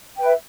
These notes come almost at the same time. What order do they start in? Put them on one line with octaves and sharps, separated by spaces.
G5 B4 E5